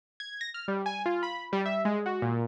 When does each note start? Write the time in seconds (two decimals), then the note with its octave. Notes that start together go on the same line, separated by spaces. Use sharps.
0.20 G#6
0.41 A#6
0.54 F6
0.68 G3
0.86 G#5
1.06 F4
1.23 B5
1.53 G3
1.66 E5
1.85 G#3
2.06 F#4
2.22 A#2